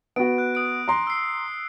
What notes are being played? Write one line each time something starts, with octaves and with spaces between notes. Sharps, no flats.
B3 F#4 D7
F#6
D#6 D7
A#5 C6
E6 C7